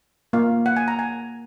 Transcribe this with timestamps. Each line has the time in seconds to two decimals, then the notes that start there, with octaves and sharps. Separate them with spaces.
0.33 A#3 F4 F5
0.66 F#5
0.77 G#5
0.88 A#5
0.99 G#5